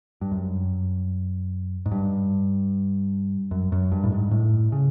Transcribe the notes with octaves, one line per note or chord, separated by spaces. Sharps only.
G2
F#2
G#2
G2
F#2
F#2
G2
A2
G#2
A2
C#3